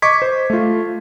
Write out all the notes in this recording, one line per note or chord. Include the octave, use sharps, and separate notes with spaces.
D#5 C#6 D6 G#6 B6
C5
A3 F4